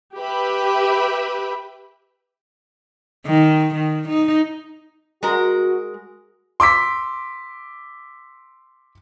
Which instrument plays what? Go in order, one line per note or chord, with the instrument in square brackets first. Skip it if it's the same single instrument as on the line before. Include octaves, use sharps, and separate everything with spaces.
[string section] G4 B4 E5 B5
[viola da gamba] D#3
D#3
D#4
[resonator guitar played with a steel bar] G#3 A#4 [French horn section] F#4
[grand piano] C6 D6 E6 B6